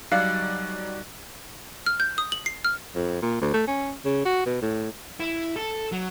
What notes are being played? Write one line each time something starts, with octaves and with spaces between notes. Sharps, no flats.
F#3 G3 D#4 D5 F5 F#6 C7
F6
G6
D#6
F#7
C7
F6
F2
A#2
D2
A3
C#4
C#3
F#4
B2
A2
E4
A4
F#3